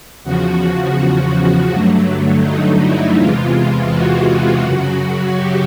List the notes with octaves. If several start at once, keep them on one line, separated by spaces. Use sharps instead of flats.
E2 C#3 F3 F#4
G2 D3 F#3 A3
D#4
E4
E2 C3 E3 G#3 F4
F#4
F#2 C#3 F#3
G4